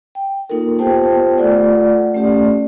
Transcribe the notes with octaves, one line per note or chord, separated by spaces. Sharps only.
G5
A#3 D#4 F4 A4 A#4
B3 F4 G4 C5 G5 A5
A3 F4 A4 D5 F#5
A3 C#4 G4 D5